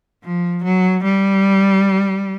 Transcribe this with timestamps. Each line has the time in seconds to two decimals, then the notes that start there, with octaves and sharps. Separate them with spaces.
0.24 F3
0.64 F#3
1.04 G3